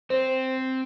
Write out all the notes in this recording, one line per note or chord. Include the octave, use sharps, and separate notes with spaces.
C4 C5